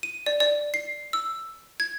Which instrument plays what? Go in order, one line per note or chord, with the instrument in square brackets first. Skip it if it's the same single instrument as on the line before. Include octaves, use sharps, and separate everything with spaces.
[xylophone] D#7
D5
D5
C7
E6
G#6